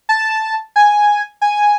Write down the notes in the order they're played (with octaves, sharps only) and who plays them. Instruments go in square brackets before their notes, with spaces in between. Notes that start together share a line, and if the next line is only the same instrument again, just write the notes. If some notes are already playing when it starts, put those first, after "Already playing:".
[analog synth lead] A5
G#5
G#5